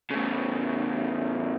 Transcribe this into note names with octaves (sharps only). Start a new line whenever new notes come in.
A2 C#3